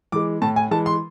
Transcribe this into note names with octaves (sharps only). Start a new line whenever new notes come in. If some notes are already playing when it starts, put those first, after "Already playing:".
E3 G#3 D6
A2 A5
G#5
E3 G#3 A5
C6